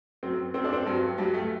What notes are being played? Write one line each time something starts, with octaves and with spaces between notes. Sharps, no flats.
F#2 F#3 C4
F#2 F#3 C4
D4
C4
G2 F#3
G2 F#3 G3
A3